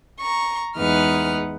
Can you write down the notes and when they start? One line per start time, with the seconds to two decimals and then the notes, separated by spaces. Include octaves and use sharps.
0.19 A#5 C#6
0.78 E2 G#3 D#4 B4 F#5 F6